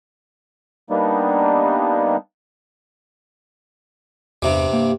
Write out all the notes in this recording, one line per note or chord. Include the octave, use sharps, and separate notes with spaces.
G3 A#3 B3 D4 D#4
E2 G2 C3 G3
A#3